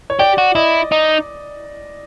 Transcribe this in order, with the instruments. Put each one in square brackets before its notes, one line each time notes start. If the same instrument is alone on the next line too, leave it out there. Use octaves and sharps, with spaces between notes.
[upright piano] C#5
[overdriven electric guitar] G4 [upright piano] D5
[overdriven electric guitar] F#4
[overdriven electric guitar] E4 [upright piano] D#5
[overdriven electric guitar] D#4